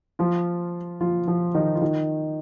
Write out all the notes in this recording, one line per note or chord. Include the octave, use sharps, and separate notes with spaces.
F3 F4
F3 F4
F3 F4
D#3 D#4
F4
D#3 D#4